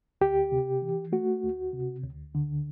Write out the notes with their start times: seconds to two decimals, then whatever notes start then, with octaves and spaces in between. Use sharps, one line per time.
0.21 D2 G4
0.52 C3
0.82 E3
1.12 A3 F#4
1.43 D2
1.73 C3
2.04 D2
2.35 D3